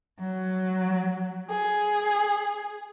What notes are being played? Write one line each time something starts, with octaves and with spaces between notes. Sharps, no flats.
F#3
G#4